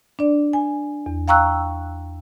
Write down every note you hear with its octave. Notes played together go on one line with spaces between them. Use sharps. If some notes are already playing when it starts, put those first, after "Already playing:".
D4 D5
G#5
E2
F5 G5 A#5 C#6 E6 F#6